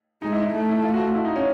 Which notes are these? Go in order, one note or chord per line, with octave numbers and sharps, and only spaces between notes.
G#3 D#4
E4
E4
A3
E4
F4
F#4
F4
E4
D#4
C#4